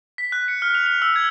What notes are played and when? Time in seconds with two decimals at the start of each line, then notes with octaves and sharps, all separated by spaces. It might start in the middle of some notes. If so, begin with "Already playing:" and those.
0.18 B6
0.32 F#6
0.48 C#7
0.62 F6
0.75 F7
0.86 F7
1.02 E6
1.16 G#6